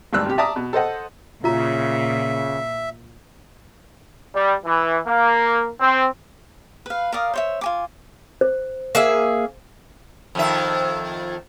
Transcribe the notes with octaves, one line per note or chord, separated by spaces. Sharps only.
G#1 D2 G2 G3 E6 F#6
C3 G4
D5 E5 A5 A#5 D6 D#6
B2
A4 C5 D#5 F#5
A#2 C#3 F4 E5 A#5
G3
E3
A#3
C4
B4 F5
A#4 D5 F5 D#6
C5 C#5 E5
F4 G#5 D6
C5
A#3 G#4 E5
F2 D#3 E5